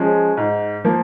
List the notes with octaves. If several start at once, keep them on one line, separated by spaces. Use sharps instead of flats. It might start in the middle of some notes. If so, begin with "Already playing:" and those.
Already playing: F3 G#3 C#4
G#2
F3 A#3